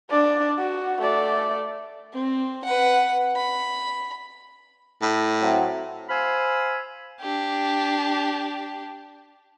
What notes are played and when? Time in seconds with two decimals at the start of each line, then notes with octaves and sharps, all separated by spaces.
0.10 D4 D5
0.58 F#4
1.02 A3 D5
2.13 C4
2.65 B4 F#5
3.36 B5
5.02 A2
5.41 F#3 A3 C4
6.09 C5 F5 G#5 B5 E6 F6
7.21 D4 G4